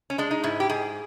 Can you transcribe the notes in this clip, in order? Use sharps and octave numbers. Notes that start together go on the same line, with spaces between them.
C#4
G#3 D4
D#4
G#2 E4
G4
G#2 G#4